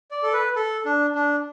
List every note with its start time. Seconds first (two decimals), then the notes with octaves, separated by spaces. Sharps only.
0.11 D5
0.23 A4
0.33 B4
0.56 A4
0.85 D4
1.15 D4